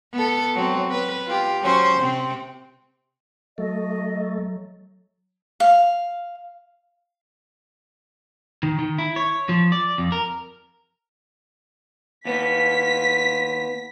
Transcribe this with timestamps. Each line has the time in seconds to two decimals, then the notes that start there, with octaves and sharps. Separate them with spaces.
0.13 B3 A4
0.55 F#3 C4
0.90 B3 B4
1.27 F4 G4
1.62 F#3 C#4 C5
1.99 C3 C4
3.58 F#3 A3 D#5
5.60 F5
8.63 D#3
8.79 D#3
8.98 E4
9.16 C#5
9.49 F3
9.72 D5
9.98 F2
10.12 A#4
12.25 D#2 B3 B6